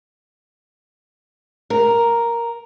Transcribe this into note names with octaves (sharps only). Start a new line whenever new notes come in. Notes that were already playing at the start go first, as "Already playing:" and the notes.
A#4